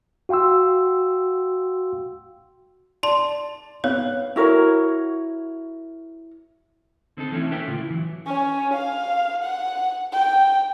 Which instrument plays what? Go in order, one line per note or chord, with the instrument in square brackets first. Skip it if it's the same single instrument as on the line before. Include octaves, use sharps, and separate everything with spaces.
[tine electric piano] F#4 F5 G5 C6 E6
[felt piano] D5 [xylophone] A5 C6
[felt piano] B3 F5 F#6 [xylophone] C#5
[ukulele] E4 F#4 A#4 C#5
[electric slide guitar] D3 C4 D#4 A4
E3 A3 C4 C#4 D#4 E4
A#3 C#4 A4 B4 E5 G5
A2 D3 F4
E4
E3 F#3
[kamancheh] C#4
F5
F#5
G5